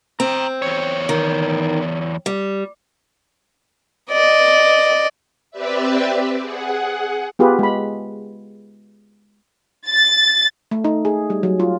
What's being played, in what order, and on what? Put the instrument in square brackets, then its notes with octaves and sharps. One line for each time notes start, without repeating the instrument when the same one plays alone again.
[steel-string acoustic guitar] C4 [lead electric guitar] G5 A#5
[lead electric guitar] E2 C#5
[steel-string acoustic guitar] D#3
G3
[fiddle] D5 D#5
[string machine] C4 G4 B4 D5 E5
G#4 F#5
[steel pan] B3 F4 G4 G#4 B4
G#3 B5
[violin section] A6
[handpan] A3
D#4
G#4
G3
F#3
F4